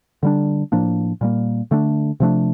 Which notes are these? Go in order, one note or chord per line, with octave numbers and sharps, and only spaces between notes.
D3 G3 D4
A2 F3 A#3 D4
A#2 G3 A#3
D3 A3 D4
C3 F3 A3 D4